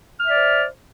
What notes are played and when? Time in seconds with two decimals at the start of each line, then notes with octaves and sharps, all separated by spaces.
0.20 F6
0.25 E5
0.30 D5
0.35 C5